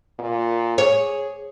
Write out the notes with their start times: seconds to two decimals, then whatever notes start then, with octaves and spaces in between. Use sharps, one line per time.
0.19 A#2
0.78 G#4 C#5